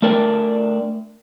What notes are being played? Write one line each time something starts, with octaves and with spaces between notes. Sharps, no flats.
A3 D4 A#4 D5 F#5 G5